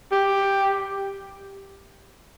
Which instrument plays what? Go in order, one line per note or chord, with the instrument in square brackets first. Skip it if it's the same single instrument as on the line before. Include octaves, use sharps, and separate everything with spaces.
[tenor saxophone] G4